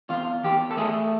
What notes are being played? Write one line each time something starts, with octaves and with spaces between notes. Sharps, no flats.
E2 F4
E2 G4
A4
A3 G#4